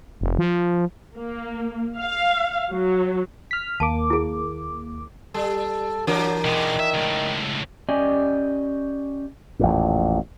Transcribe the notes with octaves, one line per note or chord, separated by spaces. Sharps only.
F1
F3
A#3
F5
F#3
F6 B6
D#2 A#3 A5 D6
E4 G#4
G3 A4
E3 F#3 D4 A#4
B2 D#3 G#3
E5
C#2 A2
C#4 G4 D5 D#5 G#5
A1 F2 A#2